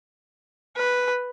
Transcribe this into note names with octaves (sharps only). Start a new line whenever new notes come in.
B4